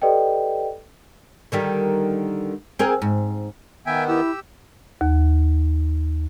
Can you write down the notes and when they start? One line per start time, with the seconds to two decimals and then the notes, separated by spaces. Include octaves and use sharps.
0.02 G4 A4 B4 D5 D#5 G5
1.52 D3 D#3 G3
2.79 C4 G#4 A#4
3.02 G#2
3.86 D#3 B3 E5 G5 G#5
4.08 E4 G4 E6
5.01 D#2